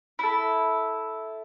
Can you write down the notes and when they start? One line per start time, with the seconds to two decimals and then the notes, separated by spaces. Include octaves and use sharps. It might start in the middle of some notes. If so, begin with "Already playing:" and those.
0.19 E4 A4